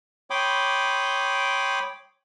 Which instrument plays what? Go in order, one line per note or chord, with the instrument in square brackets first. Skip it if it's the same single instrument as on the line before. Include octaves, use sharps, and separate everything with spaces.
[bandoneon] C#5 G5 B5 C6 D6 D#6